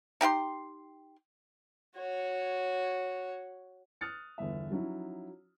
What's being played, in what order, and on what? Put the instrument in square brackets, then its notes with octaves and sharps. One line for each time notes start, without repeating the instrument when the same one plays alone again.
[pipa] D#4 G4 F#5 C6
[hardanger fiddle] F#4 C#5
[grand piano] D#6 F6 F#6 A6 C#7
G1 E2 E5
F3 F#3 C#4 D#4 E4